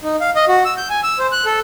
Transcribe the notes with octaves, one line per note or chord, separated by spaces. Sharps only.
D#4
F5
D#5
F#4
E6
G6
G#5
E6
C5
F#6
A4